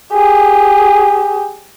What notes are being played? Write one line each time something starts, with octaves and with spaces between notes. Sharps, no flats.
G4 G#4